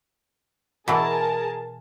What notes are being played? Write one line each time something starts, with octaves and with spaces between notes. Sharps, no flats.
B2 E3 G#4 A#4 A5